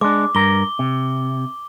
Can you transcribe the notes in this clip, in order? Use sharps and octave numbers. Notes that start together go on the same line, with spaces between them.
G#3 D4 D6
G2 A#4 G7
C3